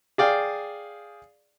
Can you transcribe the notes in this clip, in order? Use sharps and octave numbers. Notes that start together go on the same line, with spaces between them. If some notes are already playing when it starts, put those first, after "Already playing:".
G#4 D5 F5 G5